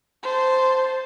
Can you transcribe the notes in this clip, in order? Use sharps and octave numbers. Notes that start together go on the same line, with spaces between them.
C5 A5